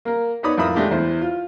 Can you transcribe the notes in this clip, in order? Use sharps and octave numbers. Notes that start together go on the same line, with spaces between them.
A#3 A#4
B3 D#4 C#5 D5 B5 D#6
F2 A2 A#4 E5 B5 D#6
G#3 A3 D4 G4
E2 E4 C5
F4